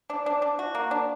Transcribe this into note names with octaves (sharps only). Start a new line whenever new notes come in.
D4
D4
D4
F#4
A#3
D4